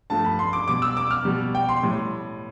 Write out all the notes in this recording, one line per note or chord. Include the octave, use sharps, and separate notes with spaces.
G2 F3 A3 A5
B5
C6
D6
B2 G3 D6
E6
D6
F6
B2 G3
G5
C6
A2 G3